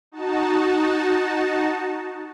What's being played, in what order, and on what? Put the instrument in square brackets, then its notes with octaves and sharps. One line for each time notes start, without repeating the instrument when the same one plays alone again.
[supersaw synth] D#4 F#4 A5